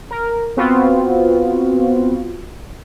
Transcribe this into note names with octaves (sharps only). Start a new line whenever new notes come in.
A#4
B3 C4 F4 F#4